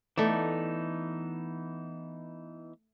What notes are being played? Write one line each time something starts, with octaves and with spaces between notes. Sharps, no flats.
E3 A3 B3 D#4 D5